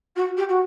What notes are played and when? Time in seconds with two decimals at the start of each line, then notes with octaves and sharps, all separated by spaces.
0.16 F#4
0.37 G4
0.49 F#4